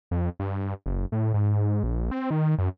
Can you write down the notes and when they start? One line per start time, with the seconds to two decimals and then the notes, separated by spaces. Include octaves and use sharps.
0.11 F2
0.39 G2
0.86 F#1
1.12 A2
1.34 G#2
1.83 A#1
2.11 C4
2.31 D#3
2.58 F#2